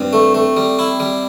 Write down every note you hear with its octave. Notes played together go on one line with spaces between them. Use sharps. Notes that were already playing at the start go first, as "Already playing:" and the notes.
Already playing: G2 C4
A3
A3
G3
E4
G3